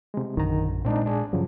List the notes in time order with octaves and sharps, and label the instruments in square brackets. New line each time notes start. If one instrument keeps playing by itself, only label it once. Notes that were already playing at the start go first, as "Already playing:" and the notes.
[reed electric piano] C3 G#3
[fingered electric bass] A#1 F#2 D3 [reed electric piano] D#3 A#5
[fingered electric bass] A#2 G#3 [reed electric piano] C4 D4 D#4
[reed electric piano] D4 G#4
[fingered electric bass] G2 F#3 [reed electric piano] C#3 F3